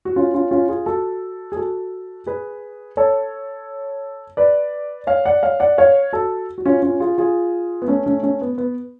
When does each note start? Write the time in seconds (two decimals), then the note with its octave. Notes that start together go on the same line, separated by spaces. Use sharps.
0.05 F#4
0.16 C#4 F4
0.34 C#4 F4
0.51 C#4 F4
0.69 F4 G#4
0.86 F#4 A4
1.52 G#4
1.56 F#4 A4
2.26 G#4 B4
2.97 A4 C#5
4.37 B4 D5
5.07 C#5 F5
5.25 D5 F#5
5.43 C#5 F5
5.60 D5 F#5
5.78 C#5 F5
6.13 F#4 A4
6.58 F#4
6.66 C#4 F4
6.82 C#4 F4
7.00 F4 G#4
7.18 F4 G#4
7.82 B3
7.88 A3 C#4
8.06 A3 C#4
8.23 A3 C#4
8.41 B3
8.58 B3